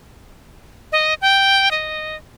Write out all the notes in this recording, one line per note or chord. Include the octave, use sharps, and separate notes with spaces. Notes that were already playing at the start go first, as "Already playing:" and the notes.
D#5
G5
D#5